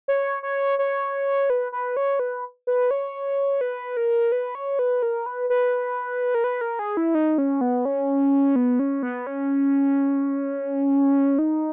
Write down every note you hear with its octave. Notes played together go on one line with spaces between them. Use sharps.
C#5
C#5
C#5
B4
B4
C#5
B4
B4
C#5
B4
A#4
B4
C#5
B4
A#4
B4
B4
A#4
B4
A#4
G#4
E4
D#4
C#4
B3
C#4
B3
C#4
B3
C#4
D#4